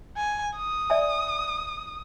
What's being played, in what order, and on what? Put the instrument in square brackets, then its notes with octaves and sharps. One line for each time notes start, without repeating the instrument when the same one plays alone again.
[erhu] G#5
D#6
[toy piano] D5 E5 G#5